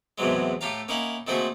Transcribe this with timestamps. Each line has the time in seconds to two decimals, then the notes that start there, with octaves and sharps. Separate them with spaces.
0.18 E2 A2 C3 E3 F#3 G#3
0.61 A2 A3 G4 F5 A#5
0.88 A#3 C#4 D#4 E4 F#5
1.27 A#2 D#3 A3 C4 F#4 G#4